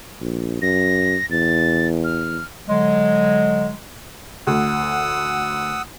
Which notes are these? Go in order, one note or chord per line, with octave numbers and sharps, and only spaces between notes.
A#1
F#2 A#6
E2 A6
F6
D3 F#3 G#3
D2 F#5 D#6 E6